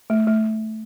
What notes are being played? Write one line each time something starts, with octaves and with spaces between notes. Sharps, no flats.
A3
A3